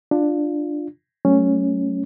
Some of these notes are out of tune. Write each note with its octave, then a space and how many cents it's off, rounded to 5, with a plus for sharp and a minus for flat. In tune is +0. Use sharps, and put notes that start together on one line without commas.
D4 +10 F4 +0
F#3 +30 A3 +0 C#4 +0